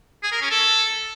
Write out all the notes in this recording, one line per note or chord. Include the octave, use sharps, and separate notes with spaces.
G#4
A#4
C#4
A4